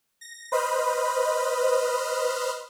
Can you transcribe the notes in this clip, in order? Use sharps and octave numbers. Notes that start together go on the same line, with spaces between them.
A#6
B4 C5 D#5 B5 F6